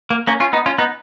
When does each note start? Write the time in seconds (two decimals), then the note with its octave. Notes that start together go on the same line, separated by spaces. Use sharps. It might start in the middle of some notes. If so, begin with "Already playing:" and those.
0.10 A#3
0.27 A#3 C#4
0.40 C#4 F4
0.53 B3 D#4
0.66 C#4 F4
0.78 B3 D#4